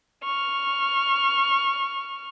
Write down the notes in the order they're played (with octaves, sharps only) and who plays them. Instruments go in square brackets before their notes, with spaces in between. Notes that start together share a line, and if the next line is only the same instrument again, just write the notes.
[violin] C#6 F6